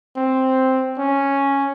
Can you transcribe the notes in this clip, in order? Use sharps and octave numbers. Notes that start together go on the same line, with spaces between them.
C4
C#4